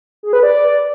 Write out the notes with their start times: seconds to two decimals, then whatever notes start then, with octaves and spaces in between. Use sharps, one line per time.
0.23 G#4
0.33 B4
0.43 D5